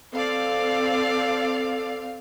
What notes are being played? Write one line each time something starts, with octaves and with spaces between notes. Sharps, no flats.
C4 A4 D5 F5